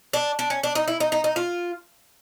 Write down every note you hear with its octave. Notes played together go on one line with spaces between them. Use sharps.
D4
D4
C#4
D4
D#4
E4
D#4
D#4
D#4
F4